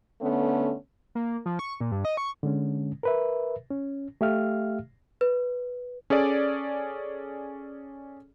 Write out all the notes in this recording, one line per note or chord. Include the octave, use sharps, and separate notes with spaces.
D3 A3 B3 C#4
A#3
F3
C#6
A#2
G2
D#5
C#6
D3 G#3 C#4
A#4 B4 E5
C#4
A3 G4 E5 F5 F6
B4
C#4 G#4 A4 D5